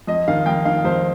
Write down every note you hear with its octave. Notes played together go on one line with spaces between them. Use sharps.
F2 D#5
D#3 F5
F2 G5
D#3 F5
F2 C5